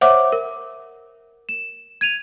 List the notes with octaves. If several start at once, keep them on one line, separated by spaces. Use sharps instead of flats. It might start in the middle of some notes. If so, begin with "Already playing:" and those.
C5 C#5 E5 F#5 D6
A#4
E7
G#6 D#7 F7